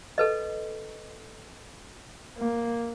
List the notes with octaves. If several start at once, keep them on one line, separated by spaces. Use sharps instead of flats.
A4 B4 D#5
A#3